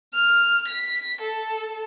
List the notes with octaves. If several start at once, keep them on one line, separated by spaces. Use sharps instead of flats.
F6
B6
A4